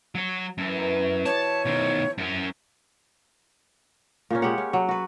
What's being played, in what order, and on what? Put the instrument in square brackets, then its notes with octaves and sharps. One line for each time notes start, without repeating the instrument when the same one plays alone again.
[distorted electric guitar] F#3 C#5
[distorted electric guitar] F#2 [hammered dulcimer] E3 A4
[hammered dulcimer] B2 E5
[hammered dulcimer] G4 [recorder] C#5 [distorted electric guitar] A5
[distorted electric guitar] B2 D#3 [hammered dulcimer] E4 C5
[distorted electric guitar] F#2 C#4
[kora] A#2 A#3 C#4
G#3 G4 C#5 F#5
C#4
F#3
F#4 B4